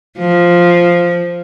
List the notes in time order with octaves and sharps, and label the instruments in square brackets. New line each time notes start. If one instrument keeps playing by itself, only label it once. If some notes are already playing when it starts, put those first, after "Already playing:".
[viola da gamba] F3